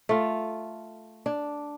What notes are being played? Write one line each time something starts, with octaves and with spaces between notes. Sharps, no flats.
A3 F4
D4